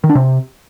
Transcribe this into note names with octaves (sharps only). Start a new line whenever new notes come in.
D#3
D4
C3